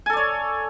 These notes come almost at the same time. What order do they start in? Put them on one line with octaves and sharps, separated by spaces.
G#5 A4 D5 C#5